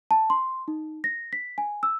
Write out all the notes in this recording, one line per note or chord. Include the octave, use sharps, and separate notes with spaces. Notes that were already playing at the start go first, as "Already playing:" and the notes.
A5
C6
D#4
A#6
B6
G#5
E6